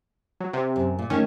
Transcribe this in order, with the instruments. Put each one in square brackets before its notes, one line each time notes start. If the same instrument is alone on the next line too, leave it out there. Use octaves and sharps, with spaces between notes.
[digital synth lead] F#3
C3
[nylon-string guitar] F#2
A#2
[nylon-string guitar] D#3 A3 [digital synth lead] C#4